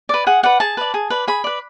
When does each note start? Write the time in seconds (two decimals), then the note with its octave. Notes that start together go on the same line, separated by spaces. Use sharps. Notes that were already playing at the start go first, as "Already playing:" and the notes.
0.09 B4 D5
0.27 G#4 F#5
0.43 B4 D5 F#5
0.60 G#4 A5
0.77 B4 D5
0.94 G#4
1.10 B4 D5
1.28 G#4 B5
1.44 B4 D5